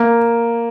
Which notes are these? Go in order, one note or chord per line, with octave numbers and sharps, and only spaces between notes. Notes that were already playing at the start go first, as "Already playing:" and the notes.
Already playing: A#3